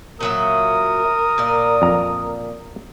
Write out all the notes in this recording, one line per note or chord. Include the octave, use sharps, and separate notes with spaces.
A#2 F#3 A#4 E5 D#6
A#2 D5
F2 A#5